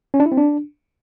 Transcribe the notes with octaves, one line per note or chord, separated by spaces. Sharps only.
C#4
D4
E4
C4
D4